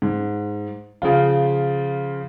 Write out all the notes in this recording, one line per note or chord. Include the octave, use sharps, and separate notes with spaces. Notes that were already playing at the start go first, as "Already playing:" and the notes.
G#2
C#3 F3 F4